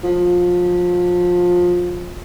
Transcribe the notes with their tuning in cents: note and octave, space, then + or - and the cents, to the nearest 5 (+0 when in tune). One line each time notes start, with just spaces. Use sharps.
F3 +25